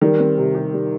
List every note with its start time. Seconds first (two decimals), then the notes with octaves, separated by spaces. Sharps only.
0.01 D#3 G3
0.20 C4
0.38 C3
0.55 G4
0.73 G3